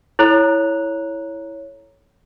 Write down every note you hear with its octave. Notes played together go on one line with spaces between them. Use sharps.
E4 A4 C#5 A#5 F#6 F7